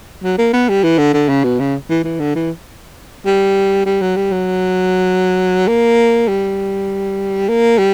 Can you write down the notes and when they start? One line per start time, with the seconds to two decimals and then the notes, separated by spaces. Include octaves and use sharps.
0.23 F#3
0.38 A#3
0.53 B3
0.69 G3
0.83 E3
0.98 D3
1.13 D3
1.29 C#3
1.44 B2
1.59 C#3
1.89 E3
2.04 E3
2.20 D3
2.35 E3
3.25 G3
3.86 G3
4.01 F#3
4.16 G3
4.32 F#3
5.68 A#3
6.28 G3
7.49 A#3
7.78 G3